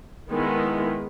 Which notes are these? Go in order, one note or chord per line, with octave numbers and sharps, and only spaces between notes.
D#3 G#3 B3 E4